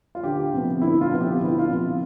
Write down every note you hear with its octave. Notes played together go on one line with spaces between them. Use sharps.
F4
D2 G4
C3 F3 B3
D2 E4
F4
C3 F3 B3
G4
D2 E4
E4
F4
C3 F3 B3